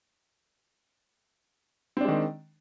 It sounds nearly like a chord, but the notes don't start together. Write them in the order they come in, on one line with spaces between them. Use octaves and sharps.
C4 D4 G#3 D#3